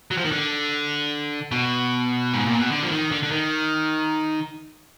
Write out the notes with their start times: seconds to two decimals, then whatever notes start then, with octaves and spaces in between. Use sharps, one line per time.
0.11 F#3
0.17 F3
0.25 D#3
0.31 D3
1.51 B2
2.34 G#2
2.46 A#2
2.59 B2
2.71 D3
2.83 F3
2.91 D#3
3.11 D3
3.23 D3
3.31 D#3